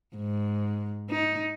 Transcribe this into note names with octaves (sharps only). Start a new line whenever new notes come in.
G#2
D#4